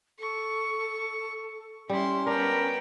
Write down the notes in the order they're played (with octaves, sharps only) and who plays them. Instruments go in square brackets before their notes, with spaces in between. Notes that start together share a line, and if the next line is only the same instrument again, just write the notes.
[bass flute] A4 [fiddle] C#6
[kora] G3 [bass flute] C#4 [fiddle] E4 C6
[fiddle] B3 G5 [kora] D4 [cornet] A#4